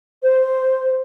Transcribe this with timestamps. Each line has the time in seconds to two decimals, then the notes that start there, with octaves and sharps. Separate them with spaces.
0.23 C5